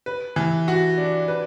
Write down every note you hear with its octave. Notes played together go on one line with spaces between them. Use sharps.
B4
E3
F#4
D4
B4